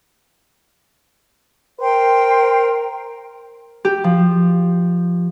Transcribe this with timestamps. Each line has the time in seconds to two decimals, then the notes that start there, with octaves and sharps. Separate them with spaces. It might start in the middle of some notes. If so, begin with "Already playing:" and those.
1.80 A#4 C5 G5 C6
3.85 G4
4.04 F3